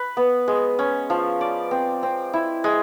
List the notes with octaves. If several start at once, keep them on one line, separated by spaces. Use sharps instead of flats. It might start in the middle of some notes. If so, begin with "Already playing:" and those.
Already playing: B4
B3
G#3
C#4
F3
D5
C4
C4
E4
G#3